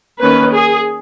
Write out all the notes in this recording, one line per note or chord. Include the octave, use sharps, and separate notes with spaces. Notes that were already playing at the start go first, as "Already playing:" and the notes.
D#3 A#3 C#4 B4
G#4